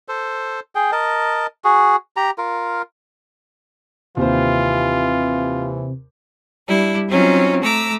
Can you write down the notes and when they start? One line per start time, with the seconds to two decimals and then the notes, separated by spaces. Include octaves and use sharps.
0.08 A4 C5
0.75 G#4 G5
0.92 A#4 D#5 A5
1.64 F#4 G#4
2.16 G4 A#5
2.38 F4 A#4
4.17 D#2 C3 E3 F4 G4 C5
6.68 G3 D4 E4
7.09 F#3 C4 C#4 D#4 F4
7.62 A3 A#5 D6 E6